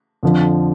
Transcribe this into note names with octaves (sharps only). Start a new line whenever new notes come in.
F2 D3 F3